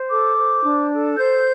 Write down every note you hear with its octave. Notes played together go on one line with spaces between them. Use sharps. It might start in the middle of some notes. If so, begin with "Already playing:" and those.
Already playing: C5
A4 D6
C5
D4
A4
C5 G6